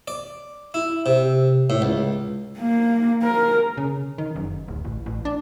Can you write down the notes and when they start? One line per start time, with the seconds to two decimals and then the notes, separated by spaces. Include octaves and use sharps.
0.08 D5
0.74 E4
1.06 C3
1.70 A2
1.82 C#2
2.58 A#3
3.23 A#4
3.77 C#3
4.18 D#3
4.36 F#1
4.68 D1
4.85 A1
5.06 A1
5.25 D4